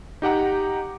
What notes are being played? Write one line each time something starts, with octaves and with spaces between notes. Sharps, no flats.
D#4 G4 F#5 A#5